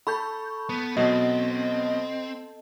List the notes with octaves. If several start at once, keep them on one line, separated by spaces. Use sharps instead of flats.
A4 B5 C#6 G6
B3
B2 F#3 B3 C4 D#5